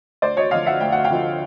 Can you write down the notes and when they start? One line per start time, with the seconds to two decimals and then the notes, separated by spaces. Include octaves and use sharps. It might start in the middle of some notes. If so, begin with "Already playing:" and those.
0.22 D2 C5 D5
0.37 C#5 D#5
0.51 D3 F3 D#5 F5
0.66 E5 F#5
0.80 D2 G5
0.92 F#5
1.04 F5 G5
1.10 D3 F3